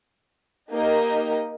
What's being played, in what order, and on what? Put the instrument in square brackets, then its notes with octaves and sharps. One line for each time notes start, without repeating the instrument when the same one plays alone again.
[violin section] A#3 D#4 G4 A#4 D#5